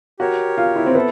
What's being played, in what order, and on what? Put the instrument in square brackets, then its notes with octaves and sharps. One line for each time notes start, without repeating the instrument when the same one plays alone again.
[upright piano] F#4 [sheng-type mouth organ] G4 A#4 C#5
[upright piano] F4
E4
C4
[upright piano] B3 [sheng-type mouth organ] E4 A4